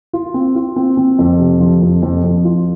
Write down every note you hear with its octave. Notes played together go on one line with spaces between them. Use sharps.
F4
C4
F4
C4
C4
F2
C3
F3
F2
F2
F2
F4